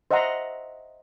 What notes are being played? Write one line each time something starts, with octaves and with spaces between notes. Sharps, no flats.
C5 D#5 E5 F#5 A#5 C6